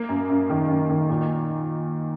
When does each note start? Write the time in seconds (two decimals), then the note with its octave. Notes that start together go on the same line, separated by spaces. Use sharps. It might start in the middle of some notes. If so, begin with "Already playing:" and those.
Already playing: A#3
0.09 F#2
0.30 F#2
0.50 D#3
0.69 F#2
0.90 D#3
1.09 A#2